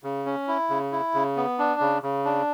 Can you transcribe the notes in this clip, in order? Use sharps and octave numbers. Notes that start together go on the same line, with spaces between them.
C#3
C#4
E4
C#3
E4
C#3
B3
D4
C#3
C#3
D4